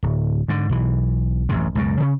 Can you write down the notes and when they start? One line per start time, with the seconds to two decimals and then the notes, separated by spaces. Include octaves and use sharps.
0.03 D1
0.48 G#2 D3
0.70 B1 E3
1.49 A1 F#2 C3
1.75 C#2 F#2 B2
2.00 C#3 C#4